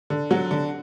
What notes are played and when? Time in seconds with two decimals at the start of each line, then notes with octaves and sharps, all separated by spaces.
0.10 D3
0.31 F#3 F#4
0.51 D3